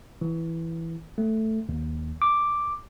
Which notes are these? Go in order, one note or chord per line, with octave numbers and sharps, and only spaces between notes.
E3
A3
D#2
D6